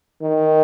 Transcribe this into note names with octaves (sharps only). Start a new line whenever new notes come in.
D#3